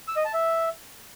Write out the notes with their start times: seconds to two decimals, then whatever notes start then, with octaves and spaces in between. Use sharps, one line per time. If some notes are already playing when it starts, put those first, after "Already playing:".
0.08 E6
0.16 D#5
0.25 A5
0.33 E5